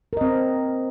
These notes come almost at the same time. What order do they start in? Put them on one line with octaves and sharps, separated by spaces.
A#4 D#5 C4